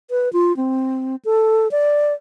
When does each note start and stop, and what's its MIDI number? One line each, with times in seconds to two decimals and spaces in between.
0.11 0.32 71
0.33 0.55 65
0.57 1.16 60
1.25 1.71 69
1.71 2.13 74